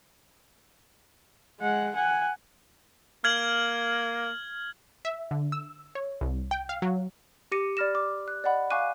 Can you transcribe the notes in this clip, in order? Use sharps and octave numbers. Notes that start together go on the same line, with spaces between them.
G#3 F#5
F#5 G#5
A#3 F6 G#6 F#7
E5
D3
E6
C#5
C2
G5
F5
F#3
G4 D6 A#6 C#7 D#7
D5 B5 F6 A#6 E7
D6
F#6
D5 D#5 F#5 B5
F5 G#5 C#6 D6 F#6 D#7